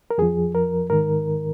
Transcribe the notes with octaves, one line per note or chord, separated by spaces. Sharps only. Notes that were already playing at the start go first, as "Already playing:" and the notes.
A#4
F2 F3 G#4
A#4
G#2 D#3 A#4